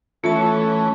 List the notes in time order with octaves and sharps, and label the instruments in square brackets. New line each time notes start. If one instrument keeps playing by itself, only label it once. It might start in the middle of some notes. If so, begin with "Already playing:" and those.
[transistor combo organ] E3 C#4 [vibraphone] A3 A5 [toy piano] F4 E5 [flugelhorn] A4